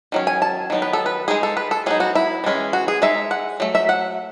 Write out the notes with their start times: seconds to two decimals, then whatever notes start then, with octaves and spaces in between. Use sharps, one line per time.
0.12 D#3 F#3 C#4
0.27 G#5
0.42 A5
0.70 D#3 F#3 B3 D#4
0.82 B4
0.93 A4
1.06 B4
1.28 G#3 D#4 G#4
1.43 A4
1.57 B4
1.71 A4
1.86 F#3 B3 D#4 G#4
2.00 F#4
2.15 E4
2.44 E3 G#3 C#4
2.73 F#4
2.88 G#4
3.02 G#3 D#4 E5
3.31 F#5
3.60 F#3 A3
3.75 E5
3.89 F#5